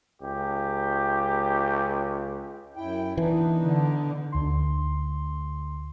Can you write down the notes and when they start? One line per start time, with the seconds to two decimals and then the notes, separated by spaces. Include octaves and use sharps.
0.22 C#2 G4
2.76 F#2 E4 G5
3.17 E3 B3 D4 D#4
3.64 D3
4.32 D2 C6